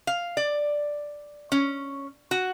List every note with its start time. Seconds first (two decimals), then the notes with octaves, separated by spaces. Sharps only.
0.07 F5
0.37 D5
1.52 C#4
2.31 F#4